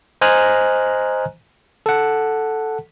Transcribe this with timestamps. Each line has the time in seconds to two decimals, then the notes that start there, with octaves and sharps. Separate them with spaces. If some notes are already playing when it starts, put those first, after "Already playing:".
0.21 C5 D#5 G#5 A#5 F6 F#6
1.86 A4 F#5